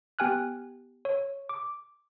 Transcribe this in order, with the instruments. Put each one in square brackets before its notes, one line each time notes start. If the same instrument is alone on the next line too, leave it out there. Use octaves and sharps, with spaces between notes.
[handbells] B3 G4 G5 G#5 F6 F#6
C#5
D6